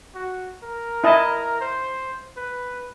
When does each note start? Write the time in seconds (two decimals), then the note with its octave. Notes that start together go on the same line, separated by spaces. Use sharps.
0.15 F#4
0.64 A#4
1.04 E4 D#5 A5
1.61 C5
2.37 B4